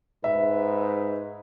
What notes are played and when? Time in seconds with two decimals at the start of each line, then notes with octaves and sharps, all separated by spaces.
0.24 G#2 B4 E5